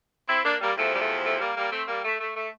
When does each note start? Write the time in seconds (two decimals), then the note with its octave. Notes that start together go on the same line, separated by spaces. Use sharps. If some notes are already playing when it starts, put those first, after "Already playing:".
0.29 C4 E4
0.45 A#3 D4
0.61 G3 A#3
0.77 E2 C3 F3 A3
0.95 G3
1.01 A3
1.25 A3
1.40 G3 A#3
1.57 G3 A#3
1.72 A3 C4
1.88 G3 A#3
2.05 A3
2.20 A3
2.36 A3